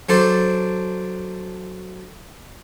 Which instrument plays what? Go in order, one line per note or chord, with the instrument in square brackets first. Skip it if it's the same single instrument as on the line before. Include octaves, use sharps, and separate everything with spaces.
[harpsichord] F#3 D4 A4 C5 D5